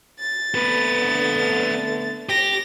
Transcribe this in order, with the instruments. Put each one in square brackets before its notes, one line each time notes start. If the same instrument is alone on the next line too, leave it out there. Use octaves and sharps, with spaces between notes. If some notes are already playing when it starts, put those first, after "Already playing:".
[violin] A6
[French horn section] D3 A3 B3 [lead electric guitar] C4 B4
[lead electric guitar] G4 [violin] A#6